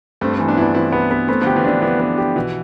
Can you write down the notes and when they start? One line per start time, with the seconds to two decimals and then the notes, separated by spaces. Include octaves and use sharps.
0.21 G2 A3 C4
0.35 E3 A3 C4
0.48 B3 D4
0.57 G2 E4
0.61 B3 D4
0.75 E3 C4 E4
0.92 B3
1.11 B3
1.28 A3 B3 C4
1.41 D3 F3 G4
1.56 E3
1.65 D3 D4
1.82 E3 B3
2.00 B3
2.18 G4
2.36 B2 E3